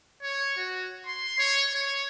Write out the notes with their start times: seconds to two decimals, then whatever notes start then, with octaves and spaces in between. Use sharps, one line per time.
0.23 C#5
0.57 F#4
1.07 C6
1.39 C#5
1.74 C#5